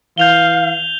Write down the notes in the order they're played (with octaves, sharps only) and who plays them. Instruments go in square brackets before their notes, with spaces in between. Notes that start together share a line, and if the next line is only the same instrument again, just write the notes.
[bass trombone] E3 [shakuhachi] F5 [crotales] G6 F7 G7